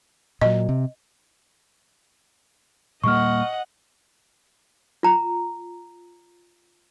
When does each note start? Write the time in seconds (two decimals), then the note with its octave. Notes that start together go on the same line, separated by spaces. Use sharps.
0.42 A#2 F#3 D#5
0.69 C3
3.04 A#2 G3 A#3 D#5 F#5 C#6 F6
5.03 F4 A#5